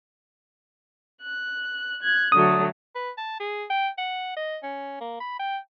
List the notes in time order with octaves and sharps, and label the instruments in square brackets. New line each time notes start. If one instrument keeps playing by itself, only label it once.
[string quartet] F#6
F#6 G#6
[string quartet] D3 F#3 A3 [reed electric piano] D#6
[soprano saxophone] B4
A5
G#4
G5
F#5
D#5
C#4
A#3
B5
G5